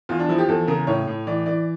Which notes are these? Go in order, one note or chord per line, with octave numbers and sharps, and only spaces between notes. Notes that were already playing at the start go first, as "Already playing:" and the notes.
E2 F4
D4
F3 E4
G4
E2 A4
C#3 A#4
A2 C#5
A2
E3 D5
E3 D5